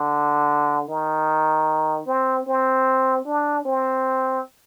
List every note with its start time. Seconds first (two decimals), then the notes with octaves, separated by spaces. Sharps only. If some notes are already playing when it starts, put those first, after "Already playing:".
Already playing: D3
0.89 D#3
2.06 C4
2.47 C4
3.25 D4
3.65 C4